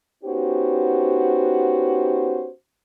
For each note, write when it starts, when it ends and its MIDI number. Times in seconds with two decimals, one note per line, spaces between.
0.24 2.49 59
0.24 2.49 61
0.24 2.49 63
0.24 2.49 66
0.24 2.49 67
0.24 2.49 72